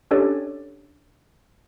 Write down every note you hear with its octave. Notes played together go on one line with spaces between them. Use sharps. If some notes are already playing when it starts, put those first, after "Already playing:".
C#4 D4 G4 A4 C#5 D5